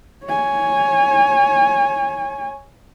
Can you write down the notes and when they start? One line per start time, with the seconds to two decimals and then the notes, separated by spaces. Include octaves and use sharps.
0.25 C#5 G#5